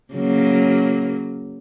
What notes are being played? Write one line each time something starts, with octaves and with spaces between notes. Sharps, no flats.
C#3 F#3 A#3